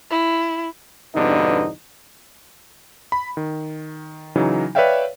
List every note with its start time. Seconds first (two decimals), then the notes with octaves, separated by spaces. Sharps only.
0.10 E4
1.15 E2 G2 B2 D3 C4 D#4
3.12 B5
3.37 D#3
4.36 C#3 E3 F#3 D#4
4.75 B4 C#5 D5 E5 F5 G5